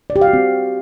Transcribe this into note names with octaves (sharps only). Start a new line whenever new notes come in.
D5
G4
F5
F#4
C4